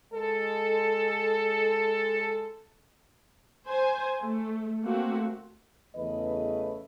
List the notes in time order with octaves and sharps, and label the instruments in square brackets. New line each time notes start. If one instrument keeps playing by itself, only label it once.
[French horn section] G#3 A4
[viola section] C5 G#5
A3
A3 A#3 C4 F#4
[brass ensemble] E2 C#3 A3 B4 D#5